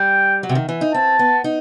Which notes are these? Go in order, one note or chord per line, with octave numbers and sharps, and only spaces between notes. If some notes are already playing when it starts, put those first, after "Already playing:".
Already playing: G3 G5
F#3
C3
D#3
E3
D#4
C4 A5
B3
D#4